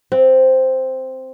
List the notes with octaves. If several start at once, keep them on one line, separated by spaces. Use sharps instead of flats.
C4